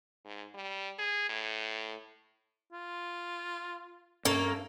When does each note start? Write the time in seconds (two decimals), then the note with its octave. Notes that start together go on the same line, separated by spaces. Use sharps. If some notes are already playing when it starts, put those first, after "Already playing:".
0.25 G#2
0.54 G3
0.99 G#4
1.29 A2
2.72 F4
4.25 G2 A#3 C#4 A4 C#5